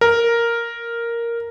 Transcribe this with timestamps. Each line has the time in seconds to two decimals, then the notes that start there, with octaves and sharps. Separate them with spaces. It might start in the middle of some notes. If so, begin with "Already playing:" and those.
0.01 A#4